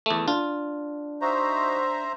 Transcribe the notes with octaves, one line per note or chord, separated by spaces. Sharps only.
E2 A3
D4 F4
D#4 F#4 C5 E5 A#5